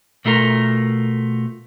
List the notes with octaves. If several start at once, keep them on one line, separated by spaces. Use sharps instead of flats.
B2 A3 F4 A#4